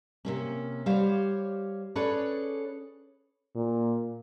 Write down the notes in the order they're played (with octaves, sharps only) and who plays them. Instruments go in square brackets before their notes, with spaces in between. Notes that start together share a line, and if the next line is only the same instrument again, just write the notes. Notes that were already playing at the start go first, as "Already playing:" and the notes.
[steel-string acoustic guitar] C3 A#3 C#4
G3 G4 C5 C#5 F5
C#4 G#4 A4 B4 C#5 D5
[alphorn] A#2